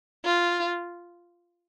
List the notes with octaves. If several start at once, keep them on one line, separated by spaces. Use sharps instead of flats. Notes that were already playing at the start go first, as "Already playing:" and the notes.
F4